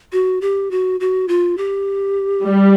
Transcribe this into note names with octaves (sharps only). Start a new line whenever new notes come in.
F#4
G4
F#4
F#4
F4
G4
G3